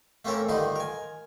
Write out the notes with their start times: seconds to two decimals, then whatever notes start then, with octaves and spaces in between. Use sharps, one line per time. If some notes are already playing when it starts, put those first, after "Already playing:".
0.25 A3 A#3 C4 C#4 A4 A#4
0.49 G2 D3 D#3 F3 D#4 C6
0.76 A#4 G#5